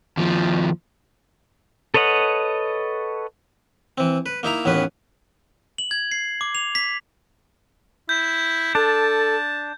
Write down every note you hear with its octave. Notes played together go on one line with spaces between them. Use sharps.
D#2 F3
A4 B4 C#5 D#5 F#5
E3 C4
B4
A#3 D#4 E4 A#5
A1 D#2 B3 C#4 B4
F#7
G#6
C7
D6
F7
B6
E4 G6
D4 A4 A5